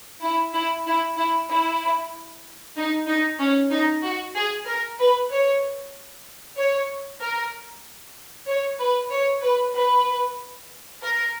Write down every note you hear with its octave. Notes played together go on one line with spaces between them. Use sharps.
E4
E4
E4
E4
E4
D#4
D#4
C#4
D#4
F#4
G#4
A#4
B4
C#5
C#5
A#4
C#5
B4
C#5
B4
B4
A#4